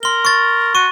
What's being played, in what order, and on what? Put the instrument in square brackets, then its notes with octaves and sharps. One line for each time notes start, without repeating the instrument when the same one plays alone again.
[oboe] A#4 [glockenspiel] C6 G7
[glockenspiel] C#6 A6
[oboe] F#4 [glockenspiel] C#6 D#7